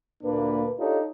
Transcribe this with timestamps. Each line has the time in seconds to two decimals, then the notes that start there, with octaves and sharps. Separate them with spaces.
0.23 D2 A#2 A#3 D4 B4
0.78 D4 D#4 F4 G4 A4 C#5